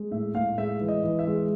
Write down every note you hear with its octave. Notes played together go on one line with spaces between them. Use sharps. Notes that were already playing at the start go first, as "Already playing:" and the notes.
Already playing: G#3
A2 E5
A2 F5
G#3 E5
E3
D#5
E3
E5
G#3